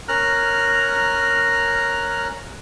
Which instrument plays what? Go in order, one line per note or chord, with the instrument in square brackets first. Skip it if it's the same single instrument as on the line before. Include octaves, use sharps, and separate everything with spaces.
[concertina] C#4 A#4 A#5 F6 F#6